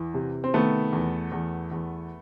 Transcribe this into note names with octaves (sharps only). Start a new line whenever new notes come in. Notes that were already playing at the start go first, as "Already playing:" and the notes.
Already playing: E2 E3
C3
C4
D#3 A3 B3
E2
E2
E2